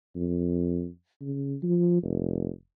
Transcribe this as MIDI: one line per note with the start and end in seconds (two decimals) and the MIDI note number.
0.16 0.88 41
1.21 1.55 49
1.63 2.02 53
2.03 2.49 29